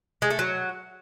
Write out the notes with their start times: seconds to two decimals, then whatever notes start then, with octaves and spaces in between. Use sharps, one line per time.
0.22 G#3
0.30 A3
0.39 F#3